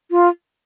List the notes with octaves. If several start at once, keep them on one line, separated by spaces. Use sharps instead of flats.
F4